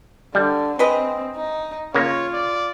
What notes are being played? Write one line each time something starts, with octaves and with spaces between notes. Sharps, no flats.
D3 G3
G#3 C4 B4 D#5
D#4
C#3 A#3 F4 C#5
D5